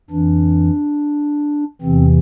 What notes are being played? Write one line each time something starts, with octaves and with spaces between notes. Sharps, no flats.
F2 E3 D4
E2 C3 E3 C4